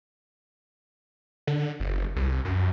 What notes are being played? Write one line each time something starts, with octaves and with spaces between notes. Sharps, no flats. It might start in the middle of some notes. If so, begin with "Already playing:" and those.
D3
F#1
C2
F#2